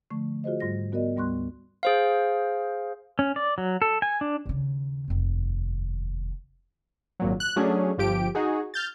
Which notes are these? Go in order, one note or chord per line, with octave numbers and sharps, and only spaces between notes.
D3 F3 A3 C#6
F4 F#4 G#4 C5 D#5
G#2 G3 F4 A#6
B3 F#4 A#4 D5 D#5
D2 G3 B3 C6 C#6 F#6
G#4 C5 F5
C#4
D5
F#3
A4
G#5
D4
D#2 C#3
F1 D#2
G#1 A#2 F#3
F#6
F#3 A3 C#4 D4 G#4
G1 F3 G4 D7
D#4 F#4 G#4
F6 G6 A6